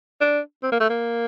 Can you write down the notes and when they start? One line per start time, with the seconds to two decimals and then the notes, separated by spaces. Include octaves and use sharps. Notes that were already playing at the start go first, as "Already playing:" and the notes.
0.21 D4
0.63 C4
0.72 A#3
0.80 A3
0.90 A#3